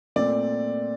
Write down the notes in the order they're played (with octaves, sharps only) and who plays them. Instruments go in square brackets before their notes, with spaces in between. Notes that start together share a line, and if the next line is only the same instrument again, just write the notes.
[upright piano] A#2 A3 C4 D5